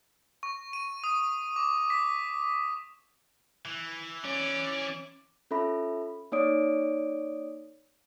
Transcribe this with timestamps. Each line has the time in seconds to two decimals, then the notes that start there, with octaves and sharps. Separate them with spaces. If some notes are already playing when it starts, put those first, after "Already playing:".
0.43 C#6
0.73 D#7
1.04 D#6
1.56 D6
1.90 B6
3.66 E3
4.25 C#4 D5
5.51 C#4 F4 A4 E5 B5
6.32 A#3 D#4 C#5 D5 D#6 D7